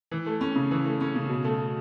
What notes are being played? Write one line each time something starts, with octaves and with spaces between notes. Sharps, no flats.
E3
A3
C#4
C#3
E3
A3
C#4
C#3
B2
A3